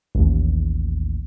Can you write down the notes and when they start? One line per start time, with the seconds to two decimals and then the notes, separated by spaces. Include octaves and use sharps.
0.15 A1 D#2